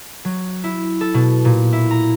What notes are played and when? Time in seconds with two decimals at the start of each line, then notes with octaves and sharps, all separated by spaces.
0.25 F#3
0.64 E4
1.01 A4
1.14 B2
1.45 A#2
1.73 E4
1.91 A#5